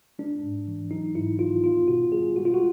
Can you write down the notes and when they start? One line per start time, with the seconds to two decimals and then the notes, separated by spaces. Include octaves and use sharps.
0.19 G#3 D4
0.43 G#2
0.68 E3
0.91 F#3 D#4
1.15 G#2 E4
1.39 D#3 F4
1.64 B3 F4
1.88 B2 F#4
2.12 G3 G#4
2.36 G#3 F#4
2.45 F4
2.54 F#4